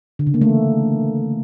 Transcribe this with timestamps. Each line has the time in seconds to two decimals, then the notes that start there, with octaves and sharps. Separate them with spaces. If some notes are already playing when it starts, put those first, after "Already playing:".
0.19 D3
0.27 C#3
0.34 A#3
0.41 A3
0.49 E3